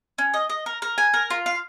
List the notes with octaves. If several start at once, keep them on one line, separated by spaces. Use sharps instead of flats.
C#4
D#5
D#5
A#4
A#4
G#5
A#4
F4
F5